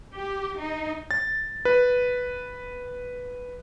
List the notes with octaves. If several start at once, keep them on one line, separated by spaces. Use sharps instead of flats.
G4
D#4
A6
B4